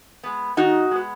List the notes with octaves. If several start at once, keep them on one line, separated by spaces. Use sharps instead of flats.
G#3 B3
D#3 D#4 F#4
G#3 B3